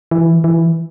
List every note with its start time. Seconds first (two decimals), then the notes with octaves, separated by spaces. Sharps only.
0.11 E3
0.44 E3